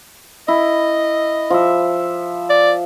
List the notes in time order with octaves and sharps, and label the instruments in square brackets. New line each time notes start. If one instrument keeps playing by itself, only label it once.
[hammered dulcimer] E4 [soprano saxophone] D#5
[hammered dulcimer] F3 E5
[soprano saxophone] D5